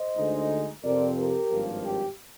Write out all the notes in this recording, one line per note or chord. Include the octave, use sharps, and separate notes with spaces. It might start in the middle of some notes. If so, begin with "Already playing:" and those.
Already playing: C5 D#5
D2 D3 G#3 D#4
F2 C3 F3 C4 A#4 D5
G4 A#4
G#1 G2 F3 A#3
G4